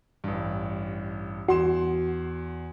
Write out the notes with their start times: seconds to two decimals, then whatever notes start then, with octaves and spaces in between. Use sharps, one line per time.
0.24 A1 G2
1.48 E2 F#4 C6 E7